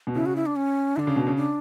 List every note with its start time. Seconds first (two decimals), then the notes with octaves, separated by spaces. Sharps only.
0.07 B2
0.15 C#3 E4
0.26 F#4
0.36 E4
0.46 D4
0.56 C#4
0.96 D3 D4 E4
1.07 C#3
1.16 B2
1.27 C#3
1.37 D4